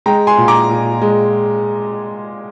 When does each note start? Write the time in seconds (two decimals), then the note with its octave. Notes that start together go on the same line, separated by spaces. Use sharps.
0.06 G#3 G5 A#5
0.27 G#5 C6
0.37 A#2
0.48 A#5 D6
0.69 A#2
1.02 G#3